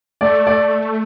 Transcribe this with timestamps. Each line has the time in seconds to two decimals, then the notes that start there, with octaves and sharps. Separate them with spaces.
0.21 A3 D5
0.47 D5